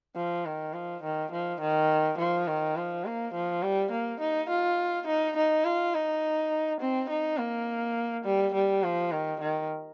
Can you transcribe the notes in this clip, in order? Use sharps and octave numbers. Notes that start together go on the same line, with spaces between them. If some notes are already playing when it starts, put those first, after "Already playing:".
F3
D#3
F3
D#3
F3
D#3
F3
D#3
F3
A#3
F3
G3
A#3
D#4
F4
D#4
D#4
F4
D#4
C4
D#4
A#3
G3
G3
F3
D#3
D#3